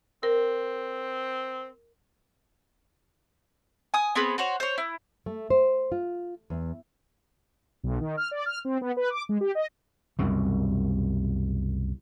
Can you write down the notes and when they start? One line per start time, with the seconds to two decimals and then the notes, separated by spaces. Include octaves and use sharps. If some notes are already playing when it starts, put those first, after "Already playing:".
0.23 C4 A#4
3.94 G#5 D#6
4.15 B3 C4 G#4 B4
4.38 F#4 C5 C#5
4.60 C5 C#5
4.78 E4
5.26 A3
5.50 C5
5.92 F4
6.50 E2
7.84 B1
8.00 D#3
8.17 F6
8.31 D5
8.46 F6
8.65 C4
8.81 B3
8.97 B4
9.10 D6
9.29 G#3
9.41 G4
9.55 D#5
10.19 C2 F#2 B2